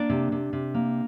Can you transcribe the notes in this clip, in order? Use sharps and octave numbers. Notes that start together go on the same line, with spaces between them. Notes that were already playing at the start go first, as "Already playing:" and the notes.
Already playing: A#3 D4 D5
C3
C3
C3
A#3